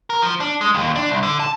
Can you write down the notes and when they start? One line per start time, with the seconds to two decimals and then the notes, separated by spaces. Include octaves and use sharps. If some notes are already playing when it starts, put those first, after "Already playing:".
0.10 A#4
0.22 F3
0.40 D4
0.61 G#3
0.75 D#2
0.96 D4
1.09 C2
1.23 D3
1.40 A5